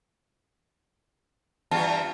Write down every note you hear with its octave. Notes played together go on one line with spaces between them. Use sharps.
E2 G2 F4 A5